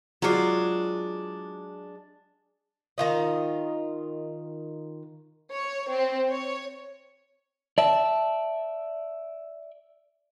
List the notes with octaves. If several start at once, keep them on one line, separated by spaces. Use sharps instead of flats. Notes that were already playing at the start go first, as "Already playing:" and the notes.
F#3 G#3 D4 F4
D#3 F4 D#5
C#5
C4
C#5
D5 E5 A5